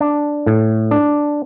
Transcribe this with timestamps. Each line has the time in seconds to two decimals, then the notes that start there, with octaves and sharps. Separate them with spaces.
0.01 D4
0.46 A2
0.91 D4